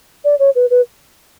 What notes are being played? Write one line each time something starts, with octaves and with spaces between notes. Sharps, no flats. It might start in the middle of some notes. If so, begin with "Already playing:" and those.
D5
C#5
B4
B4